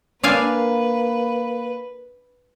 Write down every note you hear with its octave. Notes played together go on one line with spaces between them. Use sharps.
A#3 D4 B4 F5 G#5